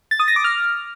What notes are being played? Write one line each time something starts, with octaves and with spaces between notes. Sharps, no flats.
A6
D#6
A#6
D6
F6